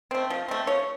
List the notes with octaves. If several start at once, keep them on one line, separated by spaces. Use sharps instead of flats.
A3 C4
F3
A3 C4
F3 C#5